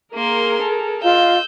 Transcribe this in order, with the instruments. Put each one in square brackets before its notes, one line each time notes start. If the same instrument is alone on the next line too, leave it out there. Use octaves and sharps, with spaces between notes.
[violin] A#3 C6 [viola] G#4 A#4
[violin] A4
[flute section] F4 D#5 F5 [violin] E6 G6